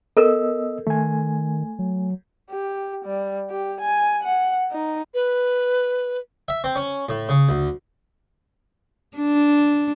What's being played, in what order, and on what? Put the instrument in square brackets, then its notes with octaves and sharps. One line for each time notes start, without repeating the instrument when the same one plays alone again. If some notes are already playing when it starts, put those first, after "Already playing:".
[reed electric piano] B3 D#5 E6 [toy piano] A4 A#4
[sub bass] D#3 [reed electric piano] A3 G#5
[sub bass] F#3
[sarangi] G4
G3
G4
G#5
F#5
D#4
[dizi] B4
[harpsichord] E5
C4
C#4
A2
C#3
D2
[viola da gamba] D4